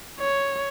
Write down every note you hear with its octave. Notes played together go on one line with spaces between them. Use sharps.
C#5